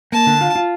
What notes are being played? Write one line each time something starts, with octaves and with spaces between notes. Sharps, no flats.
A#3 A5
D3
F4
F4